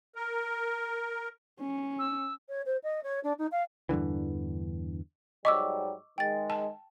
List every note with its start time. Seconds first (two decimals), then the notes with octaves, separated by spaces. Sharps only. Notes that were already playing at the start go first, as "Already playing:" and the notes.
0.15 A#4
1.61 C#4
1.99 E6
2.49 C#5
2.66 C5
2.84 D#5
3.03 C#5
3.24 D4
3.39 D#4
3.52 F5
3.89 E2 G2 D3 E3
5.45 G#2 F#3 G3 D#5 C#6 D6 E6
6.18 D#3 G#3 G5 A6
6.50 A5